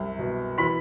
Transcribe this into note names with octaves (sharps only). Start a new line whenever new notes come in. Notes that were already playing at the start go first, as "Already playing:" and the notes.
Already playing: C2 F#2
B2
E3 B5 B6